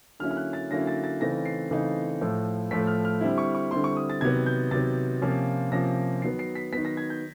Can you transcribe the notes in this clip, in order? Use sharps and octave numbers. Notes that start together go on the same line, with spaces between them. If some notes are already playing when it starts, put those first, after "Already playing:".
D3 F#3 A#3 C#4 E4 F6
F6
F#6
A6
D3 F#3 A#3 C#4 E4 A#6
A6
A6
C#3 E3 A3 C4 D#4 A#6
C7
C#3 E3 A3 C4 D#4
A2 F3 A3
A2 F3 A3 B6
F6
F6
D3 G3 C4 E4
C#6
C#6
D3 G3 C4 E4 C6
C#6
D#6
A6
C3 D#3 F#3 B3 G#6
G6
C3 D#3 F#3 B3 A6
C3 F3 A#3 C#4 F4
C3 F3 A#3 C#4 F4 A#6
D#3 F#3 B3 C7
C7
B6
D#3 F#3 B3 B6
A#6
G#6
G6